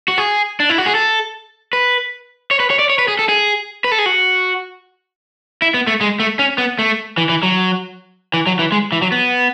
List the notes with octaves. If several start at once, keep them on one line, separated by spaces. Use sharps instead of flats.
F#4
G#4
D4
E4
F#4
G#4
A4
B4
C#5
B4
C#5
D5
C#5
B4
G#4
A4
G#4
B4
A4
G#4
F#4
E4
B3
A3
G#3
A3
C#4
B3
A3
E3
E3
F#3
E3
F#3
E3
G#3
E3
F#3
B3